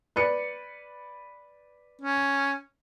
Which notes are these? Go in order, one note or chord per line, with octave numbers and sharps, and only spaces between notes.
B4 D5 C#7
C#4